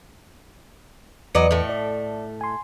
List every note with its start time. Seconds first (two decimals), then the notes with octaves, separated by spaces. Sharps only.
1.35 E2 F#3 B4 D5 D#5 C#7
1.51 A2 A3
1.69 D5
2.41 G#5 C6